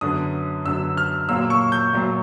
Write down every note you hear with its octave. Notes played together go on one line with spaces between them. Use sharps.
F#2 D3 F#3 B3 D#6
F#2 D3 F#3 B3 E6
F6
A#2 F#3 A#3 E6
C#6
G6
A#2 F#3 A#3